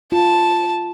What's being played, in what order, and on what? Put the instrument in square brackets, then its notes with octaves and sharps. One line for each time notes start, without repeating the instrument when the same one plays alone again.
[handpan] F4 [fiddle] A5